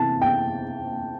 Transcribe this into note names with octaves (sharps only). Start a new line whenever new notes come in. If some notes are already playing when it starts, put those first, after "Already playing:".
Already playing: C3 E3 A5
G5